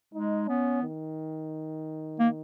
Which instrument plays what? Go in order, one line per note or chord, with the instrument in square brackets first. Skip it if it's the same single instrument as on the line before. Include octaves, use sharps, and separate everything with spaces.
[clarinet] G#3 [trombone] D#4
[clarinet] B3 [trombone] C#4
[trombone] D#3
[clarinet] A#3